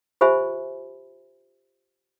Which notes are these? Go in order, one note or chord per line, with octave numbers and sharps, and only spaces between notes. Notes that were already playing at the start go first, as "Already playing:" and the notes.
F4 G4 C5 E5 G#5 B5